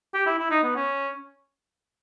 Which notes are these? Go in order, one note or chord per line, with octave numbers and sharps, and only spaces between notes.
G4
E4
E4
D#4
B3
C#4